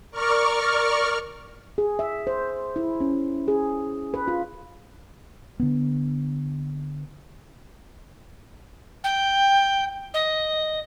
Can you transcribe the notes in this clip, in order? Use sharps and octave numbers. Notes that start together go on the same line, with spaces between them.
A#4 D5 C#6 F6
G#4
E5
C5
E4
C#4
G#4
B4
F4
D3 B3
G5
D#5